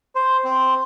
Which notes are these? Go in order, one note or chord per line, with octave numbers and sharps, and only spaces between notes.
C5
C4